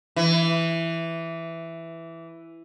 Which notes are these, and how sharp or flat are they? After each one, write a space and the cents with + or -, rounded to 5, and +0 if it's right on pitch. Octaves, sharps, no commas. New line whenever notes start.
E3 +5